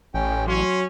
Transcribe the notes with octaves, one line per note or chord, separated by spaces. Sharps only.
A1 C#4 G5
F#3 C#4 C6